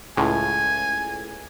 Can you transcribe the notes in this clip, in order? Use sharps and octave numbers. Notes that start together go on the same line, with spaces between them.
C#2 A2 G#5